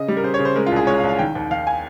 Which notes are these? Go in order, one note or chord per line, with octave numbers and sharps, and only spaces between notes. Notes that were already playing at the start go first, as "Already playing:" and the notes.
Already playing: C#3 D#5
G3
A#4
C#3 C5
C#5
C#3
C5
G#3 A#4
F4
C2 G#4
G#3 C#5
F5
C2
F5
D#3 G5
D#2
D#2 F5
G#5